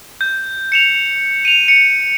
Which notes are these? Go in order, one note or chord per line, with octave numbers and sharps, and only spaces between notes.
G6
C#7 E7 F7
D#7 F7
C#7